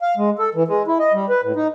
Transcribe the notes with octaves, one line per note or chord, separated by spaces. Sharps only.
F5
G#3
A4
E3
G#3
E4
D#5
G3
B4
A2
D#4